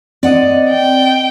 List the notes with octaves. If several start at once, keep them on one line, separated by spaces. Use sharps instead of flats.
C4 D5 D#5 F#5
G5